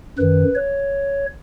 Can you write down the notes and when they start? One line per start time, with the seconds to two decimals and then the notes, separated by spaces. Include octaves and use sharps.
0.18 F#2 D#3 B4
0.55 C#5